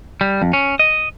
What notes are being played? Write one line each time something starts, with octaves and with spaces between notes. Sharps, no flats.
G3
F2
C#4
D#5